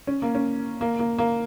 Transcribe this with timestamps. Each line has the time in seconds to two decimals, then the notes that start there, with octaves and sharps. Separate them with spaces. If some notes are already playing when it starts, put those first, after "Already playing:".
0.07 C#4
0.22 A#3
0.35 C#4
0.81 A#3
0.99 A#3
1.18 A#3